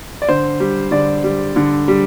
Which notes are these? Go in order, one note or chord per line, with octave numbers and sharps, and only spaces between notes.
D5
D3 C5
G3
D3 D5
G3
D3
G3